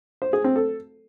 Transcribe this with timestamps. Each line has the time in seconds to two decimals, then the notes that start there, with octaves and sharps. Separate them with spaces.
0.22 C5
0.33 G#4
0.44 C4
0.56 A4